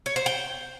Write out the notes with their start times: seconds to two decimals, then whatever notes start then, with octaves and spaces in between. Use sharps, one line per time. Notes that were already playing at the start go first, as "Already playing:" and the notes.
0.06 C#5
0.16 C5
0.26 G5